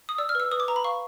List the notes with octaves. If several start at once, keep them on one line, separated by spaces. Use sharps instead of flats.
D#6
D5 E6
F6
B4 E6
B4 D#6
D6
B4 A#5
B5
F5 C#6